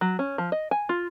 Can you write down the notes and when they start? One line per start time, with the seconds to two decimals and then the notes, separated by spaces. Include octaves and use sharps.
0.01 F#3
0.19 C#4
0.38 F3
0.52 D#5
0.71 G#5
0.89 F4